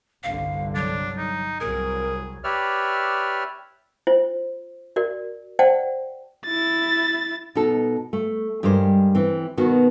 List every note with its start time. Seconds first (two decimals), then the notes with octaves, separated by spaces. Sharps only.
0.24 G1 C2 D3 F5
0.75 F#3 D4
1.18 D#4
1.60 C2 F#3 G#4 A#4
2.44 G4 B4 C#5 D5 E5 F6
4.07 F4 C5
4.96 F#4 A#4 D5
5.59 C5 D5 F#5 G5 A5
6.45 E4 A6
7.55 B2 D#4 A4
8.13 A3
8.63 G2 G3 G#3 A#4 C5
9.15 E3 C4
9.57 B2 D#3 B3 F#4